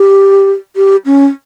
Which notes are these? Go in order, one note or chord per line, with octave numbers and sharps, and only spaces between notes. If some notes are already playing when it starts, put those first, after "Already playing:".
Already playing: G4
G4
C#4